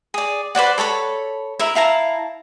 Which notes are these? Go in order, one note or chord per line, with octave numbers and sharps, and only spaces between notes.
G#4 D5
B4 C5 D5 F#5
A4 C#5 A5 B5
E4 A#4 E5
E4 F5 A5 A#5